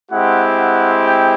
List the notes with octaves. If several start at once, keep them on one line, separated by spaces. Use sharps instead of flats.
G#3 C4 E4 G4 F#5
F#5
G5